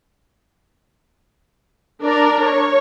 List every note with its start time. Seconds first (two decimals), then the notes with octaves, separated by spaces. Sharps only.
2.03 D4 A#4 D5
2.44 C#5